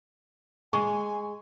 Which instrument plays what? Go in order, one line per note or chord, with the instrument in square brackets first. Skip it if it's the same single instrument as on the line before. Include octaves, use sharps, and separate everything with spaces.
[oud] G#3 [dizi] G#5 [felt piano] C#6